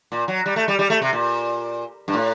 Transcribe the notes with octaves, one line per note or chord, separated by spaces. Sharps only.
A#2
F#3
G3
A3
G3
G3
A3
C3
A#2
G2
A2